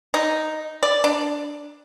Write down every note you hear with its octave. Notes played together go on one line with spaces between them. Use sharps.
D#4
D5
D4